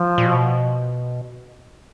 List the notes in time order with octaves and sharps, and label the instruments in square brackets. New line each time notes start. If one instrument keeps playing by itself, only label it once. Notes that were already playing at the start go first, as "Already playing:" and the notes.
Already playing: [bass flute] F3
[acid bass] A#2
B2